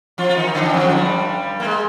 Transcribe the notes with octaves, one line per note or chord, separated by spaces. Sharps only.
F3 F4
F4
D#3 D#4
D3 D4
D#3
F2 F3
G#3
G2 G3
A#3
G#3